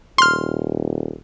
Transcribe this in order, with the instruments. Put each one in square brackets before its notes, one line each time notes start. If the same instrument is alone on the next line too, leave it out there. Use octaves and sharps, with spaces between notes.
[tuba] D#1 [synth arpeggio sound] C6 F6